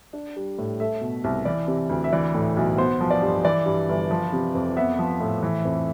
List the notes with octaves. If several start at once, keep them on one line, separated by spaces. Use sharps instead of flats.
D4
G3
A2
A3 E5
B2
C2
E3 D5
C3
D2
E5
E3 D5
A2
B1
B3 C5
F3
D5
G2
E3 D5
G2
G1
F3
C3
F2
B3 E5
F3
A2
E3
F2